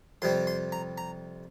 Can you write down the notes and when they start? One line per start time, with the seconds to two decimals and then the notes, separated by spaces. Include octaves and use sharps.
0.22 F2 C3 G3 C4 C6
0.47 C6
0.72 A#5
0.98 A#5